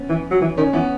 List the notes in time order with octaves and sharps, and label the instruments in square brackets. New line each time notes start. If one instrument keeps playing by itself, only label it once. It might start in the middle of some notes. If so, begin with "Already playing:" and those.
Already playing: [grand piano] B3 C#4
[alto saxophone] E3
F#3
E3
[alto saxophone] D#3 [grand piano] C#4
[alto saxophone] E3 [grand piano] B3